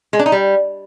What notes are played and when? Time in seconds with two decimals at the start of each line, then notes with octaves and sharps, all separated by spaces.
0.13 G#3
0.19 D4
0.26 D#4
0.32 G3